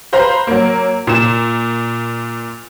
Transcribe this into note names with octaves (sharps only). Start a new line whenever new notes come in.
B4 C5 F5 A#5 B5
F#3 A#3
A#2 E7